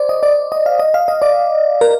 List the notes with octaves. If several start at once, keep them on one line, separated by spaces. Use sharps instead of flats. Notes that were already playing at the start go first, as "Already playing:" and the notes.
Already playing: C5 D5
D#5
D5
D#5
F5
D#5
F5
D#5
D5
A#4